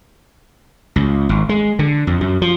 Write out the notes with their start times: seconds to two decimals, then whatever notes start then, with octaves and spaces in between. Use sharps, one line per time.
0.96 C#2
1.29 G#1
1.49 G#3
1.79 D3
2.07 F2
2.21 F#2
2.42 F3